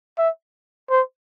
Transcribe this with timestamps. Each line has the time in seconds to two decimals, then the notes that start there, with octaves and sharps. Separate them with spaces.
0.18 E5
0.90 C5